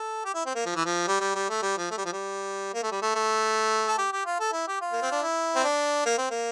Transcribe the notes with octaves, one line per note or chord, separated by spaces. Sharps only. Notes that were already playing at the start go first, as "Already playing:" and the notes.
Already playing: A4
G4
E4
C4
A#3
F3
E3
F3
G3
G3
G3
A3
G3
F3
A3
G3
F3
G3
A#3
A3
G3
A3
A3
A4
G4
G4
F4
A4
E4
G4
F4
A#3
C4
D4
E4
C4
D4
A#3
C4
A#3